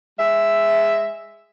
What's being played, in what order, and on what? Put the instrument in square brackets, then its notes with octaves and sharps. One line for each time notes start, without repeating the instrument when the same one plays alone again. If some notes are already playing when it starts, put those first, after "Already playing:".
[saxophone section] G#3 E5